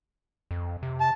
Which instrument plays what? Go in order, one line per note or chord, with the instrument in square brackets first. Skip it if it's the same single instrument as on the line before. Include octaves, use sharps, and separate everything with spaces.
[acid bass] F2
C3
[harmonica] A5